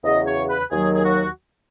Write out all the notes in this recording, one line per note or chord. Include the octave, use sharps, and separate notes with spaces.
E2 C#3 F#3 D#5
C#5
B4
D#2 D#3 F#3 G#4
G#4
F#4